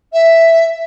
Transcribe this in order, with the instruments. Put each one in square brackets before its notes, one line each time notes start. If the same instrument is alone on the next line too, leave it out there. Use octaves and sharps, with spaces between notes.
[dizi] E5